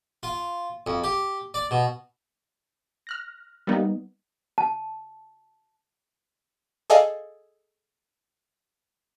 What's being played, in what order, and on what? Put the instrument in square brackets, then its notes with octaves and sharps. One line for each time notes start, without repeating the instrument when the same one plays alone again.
[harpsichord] F4
F2
G4
D5
B2
[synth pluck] F6 F#6 A#6
G3 A#3 B3 D#4
[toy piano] A5
[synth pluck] G#4 A4 D5 D#5 F5 G#5